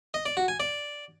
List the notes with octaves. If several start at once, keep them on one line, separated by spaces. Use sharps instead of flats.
D#5
D5
F#4
G#5
D5